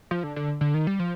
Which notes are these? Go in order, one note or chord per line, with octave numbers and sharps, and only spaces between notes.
F3
D3
D3
D3
D#3
G3
F3